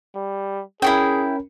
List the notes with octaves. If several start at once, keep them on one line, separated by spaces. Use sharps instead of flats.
G3
C#4 E4 F#4 G#4 A#4 G5